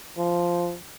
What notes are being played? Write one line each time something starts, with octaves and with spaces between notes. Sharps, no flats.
F3